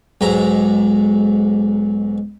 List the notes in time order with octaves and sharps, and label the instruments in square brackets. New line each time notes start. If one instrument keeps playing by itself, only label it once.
[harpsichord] B1 G#2 A#5